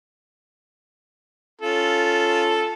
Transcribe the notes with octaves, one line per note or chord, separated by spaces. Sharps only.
C#4 F4 A4